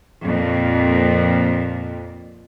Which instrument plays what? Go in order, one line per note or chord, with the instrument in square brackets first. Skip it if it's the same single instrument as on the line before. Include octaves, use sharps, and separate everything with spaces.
[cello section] F2 A#2